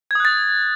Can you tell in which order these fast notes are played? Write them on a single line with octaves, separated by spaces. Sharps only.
G#6 D#6 F#6 A6